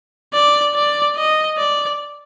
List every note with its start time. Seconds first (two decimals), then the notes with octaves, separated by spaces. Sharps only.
0.33 D5
0.75 D5
1.16 D#5
1.58 D5